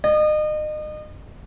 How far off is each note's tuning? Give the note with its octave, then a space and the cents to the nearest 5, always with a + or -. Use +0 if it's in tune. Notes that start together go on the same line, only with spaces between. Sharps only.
D#5 -35